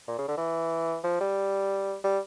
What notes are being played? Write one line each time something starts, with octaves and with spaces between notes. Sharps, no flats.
A#2
C#3
D3
E3
F3
G3
G3